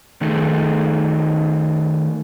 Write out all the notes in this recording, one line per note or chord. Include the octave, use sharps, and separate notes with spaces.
D#3 A3 D#4 G#4 A4